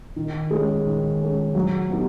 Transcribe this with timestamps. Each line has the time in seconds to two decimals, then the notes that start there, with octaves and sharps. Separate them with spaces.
0.16 D#3
0.51 G#3 C#4
0.86 D#3
1.21 G#3 C#4
1.55 F#3
1.90 B3 D#4 G4